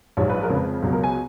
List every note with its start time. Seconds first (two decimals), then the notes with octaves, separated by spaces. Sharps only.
0.17 A#1 G#2 F#3 C#5
0.30 B4
0.43 A#4
0.50 F2 C#3 G#3
0.55 B4
0.82 C#2 B2 F#3
0.93 A#4
1.04 G#5